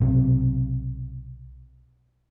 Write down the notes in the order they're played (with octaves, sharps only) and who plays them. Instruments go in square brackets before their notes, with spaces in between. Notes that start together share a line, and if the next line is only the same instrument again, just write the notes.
[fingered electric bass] B1 C3